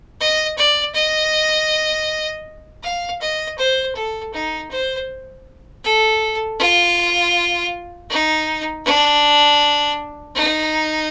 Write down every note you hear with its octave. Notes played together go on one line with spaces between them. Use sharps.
D#5
D5
D#5
F5
D#5
C5
A4
D#4
C5
A4
F4
D#4
D4
D#4